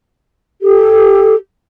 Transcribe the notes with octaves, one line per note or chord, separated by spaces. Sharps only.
G4 A4